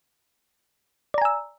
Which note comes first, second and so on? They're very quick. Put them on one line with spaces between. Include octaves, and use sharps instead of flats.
D5 A#5 G#5 E6